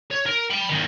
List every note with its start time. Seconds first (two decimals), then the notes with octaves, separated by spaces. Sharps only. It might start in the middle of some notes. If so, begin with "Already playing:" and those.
0.11 C#5
0.26 A#4
0.51 G5 B5
0.69 E2 D#3